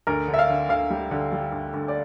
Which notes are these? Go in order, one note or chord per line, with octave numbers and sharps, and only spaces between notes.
D2 A#4
D3
E5
F5
D3
D2 F5
G3
D3
G3
D2
D2
D5